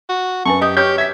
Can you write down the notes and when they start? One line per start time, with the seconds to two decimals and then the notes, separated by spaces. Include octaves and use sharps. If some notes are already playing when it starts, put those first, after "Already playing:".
0.09 F#4
0.45 F#2 B4 G#5 A5 C#6
0.61 G4 D#5 D#6 G6
0.77 G4 C#5 C#6 F6 G6
0.98 E5 G#6 B6